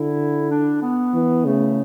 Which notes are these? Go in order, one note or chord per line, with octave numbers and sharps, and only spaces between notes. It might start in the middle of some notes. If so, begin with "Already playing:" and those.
Already playing: D3 E4
D4
B3
E3
C#3 A3